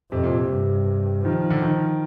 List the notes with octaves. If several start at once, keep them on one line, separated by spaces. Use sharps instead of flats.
F2 C3
A#2
C3
G2
D#3 F3
D3
D#3